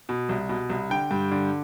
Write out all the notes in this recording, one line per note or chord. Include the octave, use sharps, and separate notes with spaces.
B2
C2
B2
C2
D3 G5
G2
D3